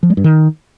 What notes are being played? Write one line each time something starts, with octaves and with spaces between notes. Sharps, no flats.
F3
G#3
G2
D#3